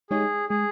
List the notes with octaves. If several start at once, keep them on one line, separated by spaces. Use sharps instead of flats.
G#3 D#4 G4 G#4 C#5
G#3 G#4